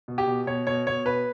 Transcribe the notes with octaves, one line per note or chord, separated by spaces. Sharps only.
B2
G4
B2
B2 C#5
B2 C#5
B2 C#5
B2 B4